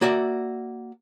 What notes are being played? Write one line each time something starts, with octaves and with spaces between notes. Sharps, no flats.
A#3 F#4 D5 E5